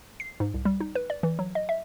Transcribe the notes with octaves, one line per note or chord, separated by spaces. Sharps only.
C7
G#2
C2
G3
D#4
B4
D5
E3
F#3
D#5
E5